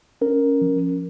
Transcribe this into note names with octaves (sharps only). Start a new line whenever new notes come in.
C#4 A#4
F3